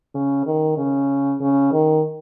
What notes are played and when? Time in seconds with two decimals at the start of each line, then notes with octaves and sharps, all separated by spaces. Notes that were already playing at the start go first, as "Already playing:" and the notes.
0.15 C#3
0.46 D#3
0.78 C#3
1.40 C#3
1.72 D#3